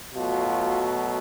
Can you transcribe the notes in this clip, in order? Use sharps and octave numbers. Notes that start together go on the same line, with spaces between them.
B2 F#3 A3 F4